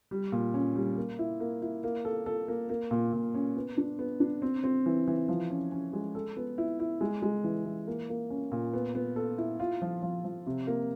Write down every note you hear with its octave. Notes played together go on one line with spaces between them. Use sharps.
G3
A#2
C#4
G3
A#3
E4
A#3
E4
A#3
A4
A4
A#3
A#3
A#2
A#2
C#4
B3
D4
B3
D4
C4
C4
E3
E3
F3
C#4
C#4
G#3
A4
B3
E4
E4
G#3
G#3
E3
E3
A#3
A#3
C#4
A#2
B3
B3
A4
E4
F4
F3
F3
F3
C3
A#3